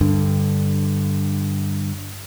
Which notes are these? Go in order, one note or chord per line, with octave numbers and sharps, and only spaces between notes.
G2 D3